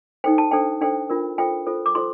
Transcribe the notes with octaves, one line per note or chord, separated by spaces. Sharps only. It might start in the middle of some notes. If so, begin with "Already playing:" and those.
D#4 A4 C5 G5
A5
D4 A4 C5 G5
D4 A4 C5 G5
D4 F4 A#4
F4 A4 C5 G5
F4 A4 C5
D6
F4 A4 C5 C6